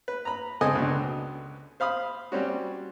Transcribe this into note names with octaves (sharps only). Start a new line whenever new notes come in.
B4
A#5 B5
C#2 C4 A4 D#5 G#5 D#6
C#2 B2 D3
C5 F5 B5 D#6
G3 C4 C#4 F#4